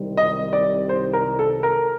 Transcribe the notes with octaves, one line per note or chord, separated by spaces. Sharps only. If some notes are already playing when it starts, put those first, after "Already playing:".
Already playing: C2 C3 D#3 G3 C4
D#5
D5
C5
A#4
A4
A#4